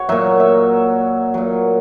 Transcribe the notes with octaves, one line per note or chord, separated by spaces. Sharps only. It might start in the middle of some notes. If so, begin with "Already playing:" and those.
Already playing: F#4 C#5
A#2 F#3 E5
E5
A#2 F#3